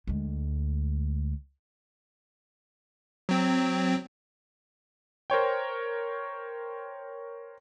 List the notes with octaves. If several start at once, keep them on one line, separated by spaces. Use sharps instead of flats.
D2 G#3
F#3 C4
A#4 C5 C#5 G5